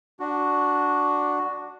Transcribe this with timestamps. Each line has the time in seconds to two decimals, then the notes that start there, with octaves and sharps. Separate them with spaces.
0.20 D4 F#4